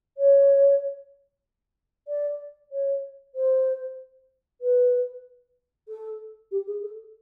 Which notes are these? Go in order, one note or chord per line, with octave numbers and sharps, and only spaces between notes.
C#5
D5
C#5
C5
B4
A4
G4
G#4
A4